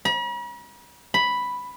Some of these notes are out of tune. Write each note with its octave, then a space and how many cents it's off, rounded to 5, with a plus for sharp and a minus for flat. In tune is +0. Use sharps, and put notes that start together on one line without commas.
B5 -45
B5 +0